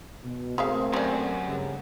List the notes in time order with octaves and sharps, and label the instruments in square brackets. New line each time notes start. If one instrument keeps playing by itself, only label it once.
[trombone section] B2
[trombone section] A3 A#3 C4 [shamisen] G#4 E5 F5
[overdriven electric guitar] F#2 [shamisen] G4 D5
[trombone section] G2 C#3